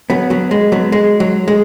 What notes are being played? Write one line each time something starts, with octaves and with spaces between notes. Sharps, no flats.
F#3 B3
F#3 B3
G#3
F#3 B3
G#3
F#3
G#3